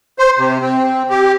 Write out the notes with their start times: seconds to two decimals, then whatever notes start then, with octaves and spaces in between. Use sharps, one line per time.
0.19 C5
0.39 C3
0.61 C4
1.10 G4